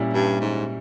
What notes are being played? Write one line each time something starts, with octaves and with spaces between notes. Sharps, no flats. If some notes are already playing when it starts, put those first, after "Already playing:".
Already playing: A#2 G3 C#4 E4
G2
G#2